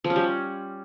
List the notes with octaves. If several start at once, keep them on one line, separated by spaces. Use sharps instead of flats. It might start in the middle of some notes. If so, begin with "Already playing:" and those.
F3
C#4
G3